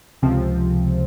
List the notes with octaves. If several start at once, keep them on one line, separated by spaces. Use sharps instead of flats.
C#2 C3 F3 C4